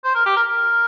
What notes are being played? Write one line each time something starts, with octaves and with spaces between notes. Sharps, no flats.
C5
A#4
G4
A#4
A#4